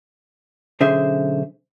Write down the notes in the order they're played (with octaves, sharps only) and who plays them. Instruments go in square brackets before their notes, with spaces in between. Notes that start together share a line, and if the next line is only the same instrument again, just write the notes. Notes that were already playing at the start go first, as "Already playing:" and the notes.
[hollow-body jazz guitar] B1 D3 C#4 G#4 C5 E5